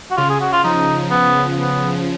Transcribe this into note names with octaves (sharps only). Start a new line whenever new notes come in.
F#4
C#3 F4
G#4
F#4
F4
F3 D#4
B3
B3